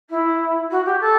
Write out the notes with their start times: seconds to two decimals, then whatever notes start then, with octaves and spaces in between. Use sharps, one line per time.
0.09 E4
0.70 F#4
0.85 G4
1.00 A4